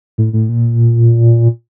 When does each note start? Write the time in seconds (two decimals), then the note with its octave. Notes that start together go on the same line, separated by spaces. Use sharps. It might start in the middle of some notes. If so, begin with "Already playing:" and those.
0.18 A2
0.33 A2
0.49 A#2